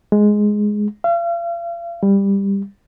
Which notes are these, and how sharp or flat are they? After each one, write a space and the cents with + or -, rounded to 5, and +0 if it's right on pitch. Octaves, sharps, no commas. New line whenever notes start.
G#3 +5
F5 -40
G3 +15